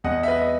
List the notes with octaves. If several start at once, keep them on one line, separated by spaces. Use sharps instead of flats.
E2 D#5 F#5
E5
B4 D#5
D#5